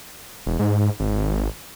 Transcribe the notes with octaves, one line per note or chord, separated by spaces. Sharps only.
E1
G#2
G#1